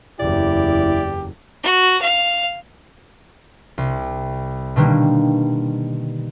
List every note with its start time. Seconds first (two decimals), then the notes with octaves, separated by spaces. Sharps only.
0.20 F#1 E2 E4 G4 D5
1.63 F#4
2.01 F5
3.78 C2
4.76 B2 D3 D#3 G3 A#3